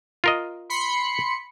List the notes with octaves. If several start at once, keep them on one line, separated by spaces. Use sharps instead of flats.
F4 A#4 D#5
B5 C6 C#7